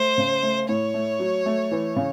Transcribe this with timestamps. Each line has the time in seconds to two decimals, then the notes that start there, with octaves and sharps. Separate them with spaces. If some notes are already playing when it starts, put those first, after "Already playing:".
Already playing: A3 C5
0.18 C#3
0.43 A3
0.69 A2 C#5
0.94 A3
1.20 F#3
1.46 A3
1.71 E3
1.96 C#3